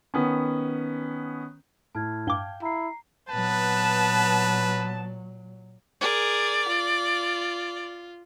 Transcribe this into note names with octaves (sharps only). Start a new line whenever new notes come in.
D#3 B3 C#4
A2 A5 F6 G#6
G2 F5 G5 D6 G7
E4 A#5 C7
A#2 F#3 B3 B4 A5
G#4 A#4 D5
F4